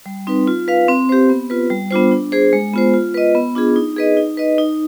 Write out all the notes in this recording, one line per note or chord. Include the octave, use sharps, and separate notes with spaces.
G3
C4 D#4 B4
F4
B4 F5
C4
G4 C5
B3
F4 B4
G3
B3 D4 F4 C5
D4
G#4 C5
G#3
B3 F4 C5
F4
B4 D#5
B3
D4 F4 G#4
D#4
G#4 B4 D#5
D#4
B4 D#5
D#4